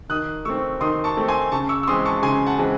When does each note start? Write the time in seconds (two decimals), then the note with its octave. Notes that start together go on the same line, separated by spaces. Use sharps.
0.09 D#3 D#6 F#6
0.45 A3 C4 C#6 E6
0.81 D#3 C6 D#6
1.04 A5 C#6
1.17 A3 C4
1.28 G#5 C6
1.52 C#3 A5 C#6
1.69 C#6 E6
1.83 E6
1.87 E3 G#3 C4 C6 D#6
2.05 A5 C#6
2.22 C#3 G#5 C6
2.46 F#5 A5
2.58 E3 G#3 C4